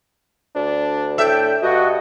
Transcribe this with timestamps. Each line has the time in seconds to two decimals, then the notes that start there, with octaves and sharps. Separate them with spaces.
0.56 D2 D4
1.18 A2 D4 A4 E5 G5
1.63 G2 F#4 D#5